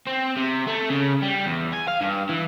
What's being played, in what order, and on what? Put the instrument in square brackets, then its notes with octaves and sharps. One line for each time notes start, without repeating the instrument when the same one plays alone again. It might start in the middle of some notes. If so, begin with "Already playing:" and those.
[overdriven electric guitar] C4
C3
A3
C#3
G3
E2
G#5
F5
G2
E3